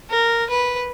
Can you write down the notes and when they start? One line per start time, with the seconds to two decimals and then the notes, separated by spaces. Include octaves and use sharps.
0.11 A#4
0.50 B4